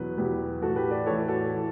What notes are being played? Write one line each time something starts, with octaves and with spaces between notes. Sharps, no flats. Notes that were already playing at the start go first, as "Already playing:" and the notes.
Already playing: E2 B2 F#3 B4
E2 B2 F#3 G4 B4
A2 E3 F#4 A4
G4 B4
B4 D5
A2 E3 A4 C#5
F#4 A4
E3